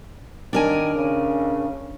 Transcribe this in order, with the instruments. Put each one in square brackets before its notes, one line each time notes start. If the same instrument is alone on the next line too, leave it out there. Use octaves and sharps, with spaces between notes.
[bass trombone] D#3 [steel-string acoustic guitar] D4 A#4 G#5
[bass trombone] C#3